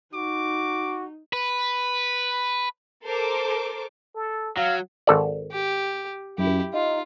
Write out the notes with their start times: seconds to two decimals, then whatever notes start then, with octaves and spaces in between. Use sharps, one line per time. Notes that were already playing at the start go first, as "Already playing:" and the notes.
0.14 D#4 F#4 D6
1.33 B4
3.03 A4 A#4 C5 D6
4.15 A4
4.57 F#3 F5
5.07 G#1 A4 D5
5.52 G4
6.38 F#2 E4 G4
6.74 D#4 F4